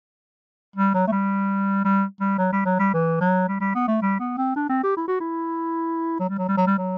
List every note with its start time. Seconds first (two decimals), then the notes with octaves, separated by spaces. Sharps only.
0.76 G3
0.94 F#3
1.07 A3
1.12 G3
1.85 G3
2.20 G3
2.39 F#3
2.52 G3
2.66 F#3
2.79 G3
2.94 E3
3.21 F#3
3.48 G3
3.60 G3
3.75 B3
3.88 A3
4.02 G3
4.19 B3
4.38 C4
4.56 D4
4.69 C4
4.83 G4
4.96 E4
5.08 F#4
5.20 E4
6.20 F#3
6.29 G3
6.38 F#3
6.48 G3
6.57 F#3
6.67 G3
6.77 F#3